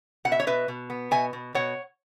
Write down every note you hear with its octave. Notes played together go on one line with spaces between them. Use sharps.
B2 F#5
E5
C#5
B2 B4 E5
B2
B3
B2 E5 G#5
B2
B2 C#5 F#5